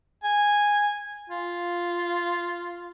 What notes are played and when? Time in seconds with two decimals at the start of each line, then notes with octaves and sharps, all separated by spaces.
0.24 G#5
1.30 F4